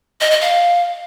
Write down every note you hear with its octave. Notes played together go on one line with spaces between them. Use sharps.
D#5
D#5
F5